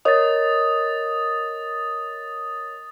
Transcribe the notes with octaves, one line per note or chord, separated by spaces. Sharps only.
A#4 C#5 D#5 D#6 A6